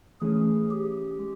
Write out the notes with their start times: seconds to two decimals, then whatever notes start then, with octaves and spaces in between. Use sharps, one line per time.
0.21 E3 A3 C#4 G#4
0.71 G4
1.19 G#3